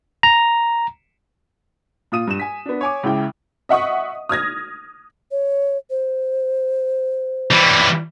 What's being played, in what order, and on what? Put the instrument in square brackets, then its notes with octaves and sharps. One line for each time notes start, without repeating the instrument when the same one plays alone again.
[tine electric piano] A#5
[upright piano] A#2 F4 D#6 D#7
G2 E7
G#5 B6
B3 D4
C#5 G#5 D6
C#2 C#3 E4 G5
[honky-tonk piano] D#5 E5 F#5 C#6 D#6
D#6 F6 G#6 A#6
[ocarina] C#5
C5
[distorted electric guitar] E3 G3